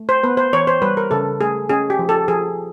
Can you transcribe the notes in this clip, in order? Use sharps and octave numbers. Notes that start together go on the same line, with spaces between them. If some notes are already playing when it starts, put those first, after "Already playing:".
Already playing: A3
C5
B3 B4
C5
E3 C#5
C5
G3 B4
A#4
C#3 A4
A3 G#4
C#4 G#4
G4
F3
A4
F3 G#4